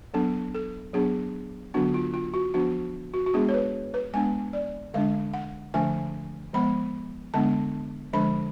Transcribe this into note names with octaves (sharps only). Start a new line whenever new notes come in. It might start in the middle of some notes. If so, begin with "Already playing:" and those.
F#3 B3 D4 A4
A4
F#3 B3 D4 G#4
D3 F#3 B3 D4 F#4
F4
F4
F#4
F3 B3 D4 F#4
F#4
F#4
G#3 B3 D4 G#4
C#5
B4
B4
G#3 B3 D4 G#5
D5
D3 G#3 D4 F5
F#5
D3 F3 A3 D4 G#5
F3 G#3 B3 B5
D3 G#3 B3 D4 A5
D3 F3 G#3 D4 B5